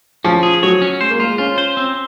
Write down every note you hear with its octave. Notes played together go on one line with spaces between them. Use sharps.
F3 C#4
G#4
F#3 C#5
C#4
G#3 C5
A#3
G#3 F4
C#4 F4
C5
C4